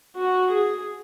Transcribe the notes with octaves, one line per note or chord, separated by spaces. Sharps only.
F#4
G#4